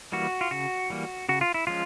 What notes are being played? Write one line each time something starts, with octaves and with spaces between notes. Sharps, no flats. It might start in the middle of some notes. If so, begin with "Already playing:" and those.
E3 G3 A#3 F#4
F4
C#3 F#4
E3 G3 A#3
C#3 F#4
F4
E4
F3 G#3 C#4 F4